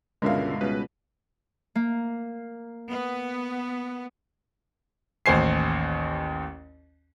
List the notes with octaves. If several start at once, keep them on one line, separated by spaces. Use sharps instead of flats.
C#2 G2 B2 D3 G#3 A#4 E5 F5
C#2 B2 G3 B4
A#3
B3
A1 D#2 C5 G#5 C7